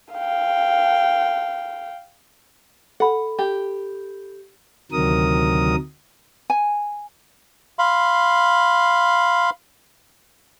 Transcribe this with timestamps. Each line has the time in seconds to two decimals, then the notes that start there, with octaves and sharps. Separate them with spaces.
0.14 F5 G5
3.00 A4 F#5 B5
3.39 G4
4.92 D2 C3 D#3 F#3 A#4 D#6
6.50 G#5
7.79 F5 B5 C6